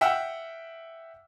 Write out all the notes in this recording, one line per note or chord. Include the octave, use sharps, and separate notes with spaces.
E5 F#5 G5 E6 F6